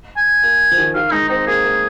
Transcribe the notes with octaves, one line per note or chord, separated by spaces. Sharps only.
G#5
A#3
F3
D#3
D#3 F5
G#3 D#4
C4 D#4
A#3 G#4
A#3